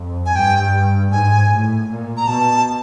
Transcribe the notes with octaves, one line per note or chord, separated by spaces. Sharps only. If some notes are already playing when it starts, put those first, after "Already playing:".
Already playing: F2
G#5
G2 G5
G#2 G#5
A2
A#2
A#5
B2 A5